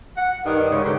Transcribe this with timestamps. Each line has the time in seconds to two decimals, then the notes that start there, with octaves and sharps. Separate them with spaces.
0.17 F#5
0.45 G2 D#3
0.71 C#3 G#3
0.84 D3 F#3 F#4 G4